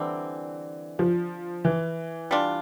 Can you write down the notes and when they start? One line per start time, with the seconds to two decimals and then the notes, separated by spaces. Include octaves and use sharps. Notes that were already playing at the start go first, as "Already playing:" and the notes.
Already playing: D3 E3 G3 C4
0.99 F3
1.65 E3
2.31 G3 D4 F4